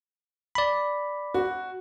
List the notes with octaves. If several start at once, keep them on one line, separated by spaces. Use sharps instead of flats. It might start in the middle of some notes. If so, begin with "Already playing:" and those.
D5 B5
F#4